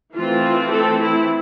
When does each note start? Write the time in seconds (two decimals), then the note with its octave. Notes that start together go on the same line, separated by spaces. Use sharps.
0.15 E3 A3 C4 F4
0.72 A4
1.00 E4